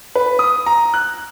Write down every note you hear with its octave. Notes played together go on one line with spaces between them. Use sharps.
B4
D#6
A#5
F#6